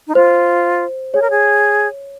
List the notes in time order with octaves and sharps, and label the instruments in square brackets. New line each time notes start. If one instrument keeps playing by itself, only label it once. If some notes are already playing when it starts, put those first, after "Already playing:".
[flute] D#4
[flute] F4 [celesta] C5
[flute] G#4 [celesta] C#5
[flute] A#4
G#4